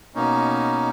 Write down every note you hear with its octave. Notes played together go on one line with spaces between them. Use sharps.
B2 A#3 C#4 D#4